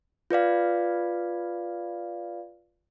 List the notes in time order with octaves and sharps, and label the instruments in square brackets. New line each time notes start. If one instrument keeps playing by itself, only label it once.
[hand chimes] F4 B4 D5 F5